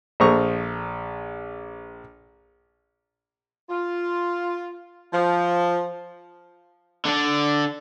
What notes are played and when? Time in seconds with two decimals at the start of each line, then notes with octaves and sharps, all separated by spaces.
0.20 A#1 A4 C5 A#5 C#6
3.70 F4
5.12 F3
7.05 D3 D4